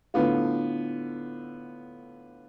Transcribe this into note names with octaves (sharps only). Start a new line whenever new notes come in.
A2 D3 B3 F4